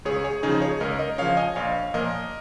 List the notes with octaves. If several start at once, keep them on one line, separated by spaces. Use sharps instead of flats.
C#2 G#4 C#5
G#4 C#5
C#3 F3 D#4 G#4
G#4 C#5
C#2 A#4 D#5
A#4 D#5
C#3 F3 C#5 F5
D#5 G#5
A#1 C#5 F5
A#2 F3 A#4 D#5